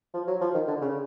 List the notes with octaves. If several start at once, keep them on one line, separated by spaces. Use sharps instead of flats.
F3
F#3
F3
D#3
D3
C#3